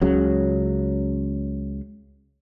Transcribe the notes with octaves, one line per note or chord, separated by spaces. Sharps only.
C#2 C#3 F#3